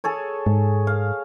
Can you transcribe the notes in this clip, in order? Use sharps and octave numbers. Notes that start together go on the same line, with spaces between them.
G#4 A4 C#5
G#2
F5